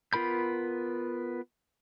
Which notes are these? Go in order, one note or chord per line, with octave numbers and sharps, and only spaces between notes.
B3 F4 A#4 B5 G6